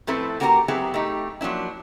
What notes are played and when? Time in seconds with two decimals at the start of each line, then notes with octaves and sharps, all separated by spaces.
0.07 A2 F3 C4 E4 A4 B4
0.40 A#3 F#4 G4 A#4 B4 A#5
0.68 F#3 B3 C4 E4 G4 G#4
0.94 A3 D#4 G4
1.41 F3 F#3 A#3 D4 E4